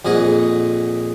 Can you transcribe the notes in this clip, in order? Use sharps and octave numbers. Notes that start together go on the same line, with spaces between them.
F2 A#2 G#4 D#5 F#5